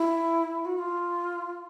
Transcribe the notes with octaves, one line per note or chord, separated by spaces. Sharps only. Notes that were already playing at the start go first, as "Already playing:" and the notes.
Already playing: E4
F#4
F4